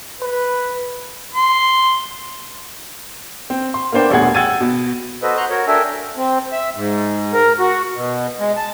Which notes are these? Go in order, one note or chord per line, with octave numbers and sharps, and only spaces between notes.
B4
C6
C4
C6
A#3 B3 D4 C5 G5
D#1 A1 B2 G#4 F#5 G#6
F#5 G5 E6 G#6 A6 D#7
B2
F#4 A4 B4 C5 D#5
F#5 A#5 C6 C#6 F#6 G6
F#4 A#4 C#5
D4 A4 A#4 E5 G5 G#5
C4
E5
G#2
A#4
F#4
B2
G#3
A5